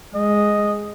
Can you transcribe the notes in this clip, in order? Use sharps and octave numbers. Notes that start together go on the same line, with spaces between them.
G#3 D#5